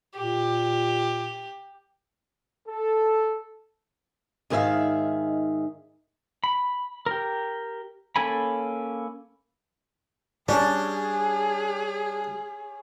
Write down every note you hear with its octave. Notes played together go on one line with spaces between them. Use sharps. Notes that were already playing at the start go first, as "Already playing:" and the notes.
A#2 G4
A4
G#2 D#3 G#4 C5 E5 F5
B5
G4 A#4
A#3 C#4 A4 G#5 B5
G3 C#4 D4 G#4